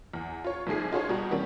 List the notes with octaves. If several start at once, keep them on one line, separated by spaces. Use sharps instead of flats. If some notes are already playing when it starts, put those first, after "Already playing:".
E2
F4 C#5
C2 G#2 F3 G#4 C7
D#4 F4 F#4 G#4 C5 C#5
B2 G3 F#4 A#5
E3 G3 A#3 C4 C#4